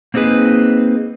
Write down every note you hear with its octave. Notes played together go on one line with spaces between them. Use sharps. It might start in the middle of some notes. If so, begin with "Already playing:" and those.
A#3 C4 D#4 G#4 B4